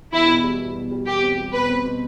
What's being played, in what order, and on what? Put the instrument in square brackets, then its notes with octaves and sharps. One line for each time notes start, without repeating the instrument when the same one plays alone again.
[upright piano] E2 [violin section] E4
[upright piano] B2
G3
G3
B2
G3
[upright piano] E2 [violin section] G4
[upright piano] C4
G3
[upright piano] B2 [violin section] B4
[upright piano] C4
B2